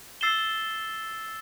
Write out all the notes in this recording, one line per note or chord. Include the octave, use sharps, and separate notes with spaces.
E6 A6 C7 E7 G7